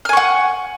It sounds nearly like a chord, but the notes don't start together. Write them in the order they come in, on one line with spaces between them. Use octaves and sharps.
F6 G#5 C#6 F#5